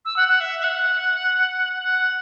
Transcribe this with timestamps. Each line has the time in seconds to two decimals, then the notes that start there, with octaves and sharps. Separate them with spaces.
0.05 E6
0.16 F#5
0.28 F#5
0.40 E5
0.59 E5
0.64 F#5
1.82 F#5